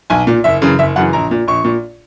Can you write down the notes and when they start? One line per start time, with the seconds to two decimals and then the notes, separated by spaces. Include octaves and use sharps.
0.10 B1 G#5
0.27 A#2
0.44 F#1 E5
0.61 F#2 C#3 E3
0.79 F#1 E5
0.96 F#2 C#3 E3 F#5
1.13 A#1 A#5
1.31 A#2
1.48 A#1 C#6
1.64 A#2